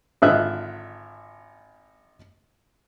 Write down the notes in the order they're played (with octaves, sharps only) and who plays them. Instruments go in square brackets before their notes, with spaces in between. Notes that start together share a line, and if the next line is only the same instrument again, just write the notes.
[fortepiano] G#1 D3 F4 D#5 E5 F#6